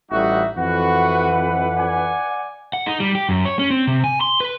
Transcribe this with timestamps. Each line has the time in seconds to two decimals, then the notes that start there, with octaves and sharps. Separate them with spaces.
0.11 A1 G3 D#4 F#4 E5
0.57 F2 E3 F#4 B4 F#5
1.78 D5 G#5
2.73 F#5
2.86 D#4
3.00 G3
3.15 G4
3.29 F#2
3.45 C#5
3.59 C#4
3.70 C4
3.87 C3
4.04 G#5
4.21 C6
4.40 B4